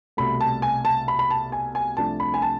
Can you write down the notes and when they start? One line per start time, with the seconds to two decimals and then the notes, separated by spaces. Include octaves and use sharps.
0.17 C2 B2 A3 B5
0.41 A5
0.62 G#5
0.85 A5
1.08 B5
1.19 B5
1.30 A5
1.52 G#5
1.75 G#5
1.97 C2 C3 F3 A3 D4 A5
2.20 B5
2.34 G#5
2.42 A5